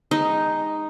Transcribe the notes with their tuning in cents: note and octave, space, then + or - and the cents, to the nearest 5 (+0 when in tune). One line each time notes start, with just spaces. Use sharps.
G#3 -25 D#4 +0